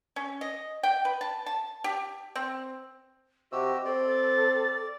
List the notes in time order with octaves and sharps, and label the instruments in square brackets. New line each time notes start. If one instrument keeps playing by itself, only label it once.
[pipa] C#4
D#5
G5
B4
A5
A5
G4
C4
[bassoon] C3 [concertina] F#4 G4 E6 [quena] D#5
[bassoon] C4 [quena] A4 [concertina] D5
[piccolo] A6